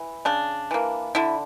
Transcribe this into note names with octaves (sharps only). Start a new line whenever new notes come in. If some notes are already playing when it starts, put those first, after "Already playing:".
Already playing: E3
C#3 D4
E3 A#3
D3 E4